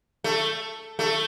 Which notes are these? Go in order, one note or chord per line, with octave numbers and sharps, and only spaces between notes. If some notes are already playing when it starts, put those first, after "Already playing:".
A3
A3